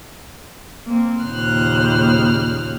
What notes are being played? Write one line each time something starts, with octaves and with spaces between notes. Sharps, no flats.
A#3 C4
D#2 A#2 C#3 C5 F6 F#6